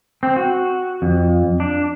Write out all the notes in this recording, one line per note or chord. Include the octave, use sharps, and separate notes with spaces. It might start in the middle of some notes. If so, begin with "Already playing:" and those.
C4
F#4
F2
D4